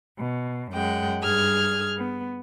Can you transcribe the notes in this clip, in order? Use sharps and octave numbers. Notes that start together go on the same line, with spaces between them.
B2
F#2 G#3 F#5 G5
G2 G#4 F6 G#6
B3